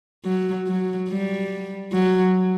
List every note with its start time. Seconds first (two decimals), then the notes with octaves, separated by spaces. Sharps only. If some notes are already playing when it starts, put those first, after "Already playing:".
0.25 F#3
0.67 F#3
1.09 G3
1.93 F#3